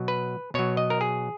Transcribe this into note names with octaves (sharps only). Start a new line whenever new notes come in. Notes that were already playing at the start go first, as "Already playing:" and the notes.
Already playing: B2 F#3
B4
B2 F#3 C#5
D#5
A#4
G#4